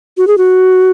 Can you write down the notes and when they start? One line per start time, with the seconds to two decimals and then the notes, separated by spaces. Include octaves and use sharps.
0.17 F#4
0.28 G#4
0.38 F#4